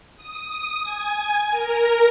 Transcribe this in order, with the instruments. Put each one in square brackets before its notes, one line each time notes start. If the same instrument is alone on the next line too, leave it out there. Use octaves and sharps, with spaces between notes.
[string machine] D#6
G#5
A#4